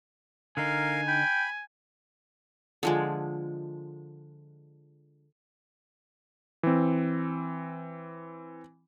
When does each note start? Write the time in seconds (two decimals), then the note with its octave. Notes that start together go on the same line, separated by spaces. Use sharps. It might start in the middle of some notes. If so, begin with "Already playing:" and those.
0.57 D3 D#4 A#4 F5 G#5
1.08 G5 B5
2.83 D3 F3 G#3
6.63 E3 C4